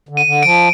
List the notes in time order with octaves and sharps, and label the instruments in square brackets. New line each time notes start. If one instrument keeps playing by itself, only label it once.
[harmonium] D3
[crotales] D#7
[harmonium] D3
[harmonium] F3 [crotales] D7